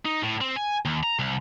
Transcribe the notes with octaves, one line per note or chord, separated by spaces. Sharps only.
D#4
A2
C4
G#5
D#2
A#5
C2